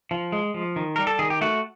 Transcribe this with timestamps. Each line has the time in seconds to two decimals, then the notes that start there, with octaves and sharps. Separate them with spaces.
0.11 F3
0.32 G#3
0.54 F3
0.76 D#3
0.96 G3 A#4
1.07 A4
1.19 D#3 G#4
1.30 G4
1.41 A3 F#4